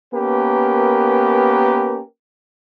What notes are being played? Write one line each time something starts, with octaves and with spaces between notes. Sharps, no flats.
A#3 B3 C#4 G4 A#4 B4